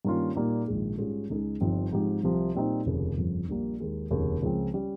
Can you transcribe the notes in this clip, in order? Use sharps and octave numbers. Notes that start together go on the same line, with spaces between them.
G2 D#3 A#3 C#4 F4
A#2 G3 A#3 D#4
A#1 G#2 D#3 G#3
G#2 G3 C#4 F4 G#4
C#2 C#3 G#3 D#4 G#4
G1 G2 F3 C4 D#4
G#2 F3 C4 D#4 G4
C2 C3 F3
A#2 G3 C4 D#4
F1 D#2 C#3
G1 F2 C#3 F3
A#1 A#2 G3 A#3
D#2 D#3 G#3
F1 D#2 C#3
C#2 C#3 F3 C4
G3 C#4